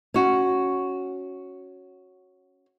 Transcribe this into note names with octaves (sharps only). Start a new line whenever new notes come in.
C#4 F#4